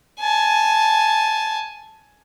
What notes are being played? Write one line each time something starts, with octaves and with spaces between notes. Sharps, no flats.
G#5 A5